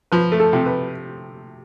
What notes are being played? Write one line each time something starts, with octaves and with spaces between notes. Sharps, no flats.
F3 B4
A3
A4
C3
B4